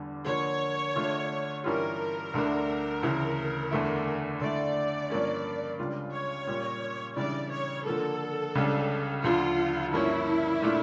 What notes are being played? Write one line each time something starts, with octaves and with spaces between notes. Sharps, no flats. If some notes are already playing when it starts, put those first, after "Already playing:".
Already playing: E2 D3 G3
D3 F3 A#3 C#5
D3 A3 D4 F4
G2 E3 G3 C#4 F4 A#4
D2 D3 A3 D4
D2 C#3 E3
E2 D3 A3 E4
D3 A3 E4 D5
G2 F3 A#3 C#4
C#2 C#3 G3 D4 F4
C#5
A#2 G3 C#4 F4
C#3 E3 G3 D4 D5
C#5
D3 F3 A#3 A4
C#2 C#3 G3 D4
D2 D3 F3 F4
G2 F3 A#3 C#4 E4
A#2 A3 D4 F4